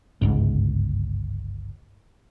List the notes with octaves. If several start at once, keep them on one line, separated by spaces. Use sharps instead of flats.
G1 C#2 G#2